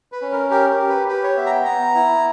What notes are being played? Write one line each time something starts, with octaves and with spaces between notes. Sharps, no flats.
B4
C#4
A#4
G4 A#4
A#4
G4
B4
G4 B4
C#5
B3 E5
A#5
G5
B3 A#5
E4